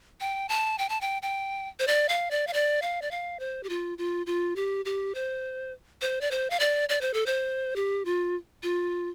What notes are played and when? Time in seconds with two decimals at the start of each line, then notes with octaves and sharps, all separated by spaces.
0.21 G5
0.49 A5
0.78 G5
0.89 A5
1.01 G5
1.22 G5
1.79 C5
1.87 D5
2.09 F5
2.31 D5
2.47 F5
2.53 D5
2.82 F5
3.02 D5
3.11 F5
3.39 C5
3.63 G4
3.69 F4
3.98 F4
4.27 F4
4.56 G4
4.85 G4
5.15 C5
6.01 C5
6.21 D5
6.31 C5
6.50 F5
6.60 D5
6.89 D5
7.01 C5
7.14 A4
7.26 C5
7.76 G4
8.05 F4
8.63 F4